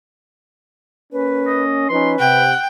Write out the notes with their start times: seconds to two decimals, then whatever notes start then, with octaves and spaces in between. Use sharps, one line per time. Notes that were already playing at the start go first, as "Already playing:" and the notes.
1.13 A#3 C#4 B4
1.47 D#5
1.89 F3 C#4 D#4 B4 C6
2.19 C3 F#5 G5